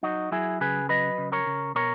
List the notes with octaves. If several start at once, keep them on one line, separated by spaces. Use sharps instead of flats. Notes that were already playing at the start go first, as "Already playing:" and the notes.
F#3 D#4 F#4
F#3 E4 G#4
C#3 G#4 B4
F#3 B4 D#5
C#3
A#4 C#5
C#3
B2 A#4 C#5